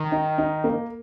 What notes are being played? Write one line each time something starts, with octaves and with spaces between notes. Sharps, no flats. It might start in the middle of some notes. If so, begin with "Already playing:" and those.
Already playing: D#3
D#4
D#4
A#3